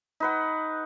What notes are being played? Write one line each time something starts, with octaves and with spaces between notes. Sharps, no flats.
D#4 B4 F#5